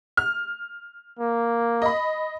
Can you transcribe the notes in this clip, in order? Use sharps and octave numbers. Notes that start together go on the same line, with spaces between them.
F6
A#3
D#5 B5